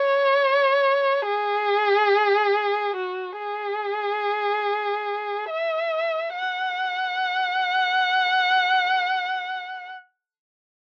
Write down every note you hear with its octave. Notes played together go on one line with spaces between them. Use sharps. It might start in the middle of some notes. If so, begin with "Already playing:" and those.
Already playing: C#5
G#4
F#4
G#4
E5
F#5